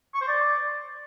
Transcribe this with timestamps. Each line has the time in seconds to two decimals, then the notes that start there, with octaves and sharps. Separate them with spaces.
0.14 C#6
0.21 C5
0.28 D5